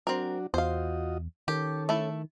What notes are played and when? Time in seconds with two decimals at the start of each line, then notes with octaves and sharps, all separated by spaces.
0.07 F#3 C4 D4 F#4 A#4
0.54 E2 F4 F#4 C5 D#5 F5
1.48 D#3 C#4 G4 A4
1.89 A3 E4